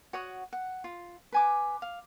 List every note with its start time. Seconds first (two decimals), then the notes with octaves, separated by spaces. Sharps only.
0.13 F#4 C#5 F#5 D#6
0.53 F#5
0.84 F4
1.32 B4 G#5 D6
1.82 F5